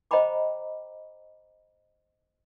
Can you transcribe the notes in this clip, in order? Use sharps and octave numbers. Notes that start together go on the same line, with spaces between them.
C5 D#5 G5 A#5 B5 D6